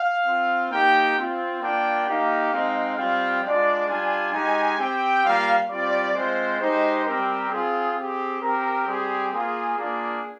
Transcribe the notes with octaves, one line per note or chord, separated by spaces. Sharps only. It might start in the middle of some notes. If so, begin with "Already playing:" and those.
Already playing: F5
C4 F4
A#3 D#4 G4 G5
C4 F4
A#3 D4 F4 G5
A#3 D#4 G4 F5
G#3 C4 D#4
G3 C4 F4 F5
G#3 D4 F4 D5
G3 D4 F4 G#5
G#3 D#4 G4 G#5
C4 G4 G5
G3 A#3 F4 F5
G3 C4 F4 D5
G#3 C4 F4 C5
G#3 D#4 G4 C5
G3 C4 G4 A#4
C4 F4 G#4
C4 G4 G#4
C4 G4 A#4
G3 C4 G4 G#4
A#3 F4 G#4
A#3 D4 F4 G#4